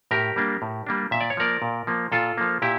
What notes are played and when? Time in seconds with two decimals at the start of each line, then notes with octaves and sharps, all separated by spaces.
0.11 A2 G4 A#4
0.36 G3 A#3 D4
0.62 A2
0.87 G3 A#3 D4
1.11 A#2 E5
1.21 D5
1.30 C#5
1.37 F3 A#3 A#4 D5
1.62 A#2
1.87 F3 A#3
2.12 A#2 F4 A4
2.38 F3 A#3
2.62 A#2 E4 G4